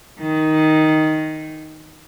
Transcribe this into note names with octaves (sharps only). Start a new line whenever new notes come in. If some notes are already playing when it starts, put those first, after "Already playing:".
D#3 D#4